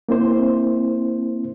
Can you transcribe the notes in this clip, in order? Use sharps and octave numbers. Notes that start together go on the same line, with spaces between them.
A#3 C4 E4 C5